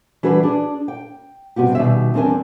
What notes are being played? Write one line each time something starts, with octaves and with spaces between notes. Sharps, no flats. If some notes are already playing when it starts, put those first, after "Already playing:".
E3 G3 D4 F#4 G#4 B4
D4 G#4
G5
G2 C3 B3 F#4 G4
B2 D#3 G3 G#4 E5
E2 G3 C4 D4 A#4 G#5